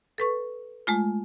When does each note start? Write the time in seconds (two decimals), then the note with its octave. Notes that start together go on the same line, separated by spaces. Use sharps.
0.18 A4 B4 C#6
0.87 G#3 A3 F4